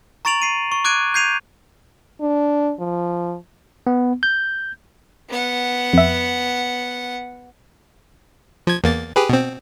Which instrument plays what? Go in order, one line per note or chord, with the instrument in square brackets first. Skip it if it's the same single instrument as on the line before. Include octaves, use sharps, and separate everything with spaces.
[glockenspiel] A#5 C#6 A6 D7 F7 F#7
C7 D#7
C#6
D6 F#6 G#6 D7 D#7
G6 G#6 C7 D#7 F7
[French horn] D4
F3
[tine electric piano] B3
G6
[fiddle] B3 F#5
[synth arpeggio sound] F2 E5
[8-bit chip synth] F3 G#6
E2 A#3 A6
G4 G#4 B4
B2 C4